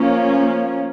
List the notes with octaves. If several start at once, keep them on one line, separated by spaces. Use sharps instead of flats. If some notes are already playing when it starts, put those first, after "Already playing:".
Already playing: F3 A#3 C#4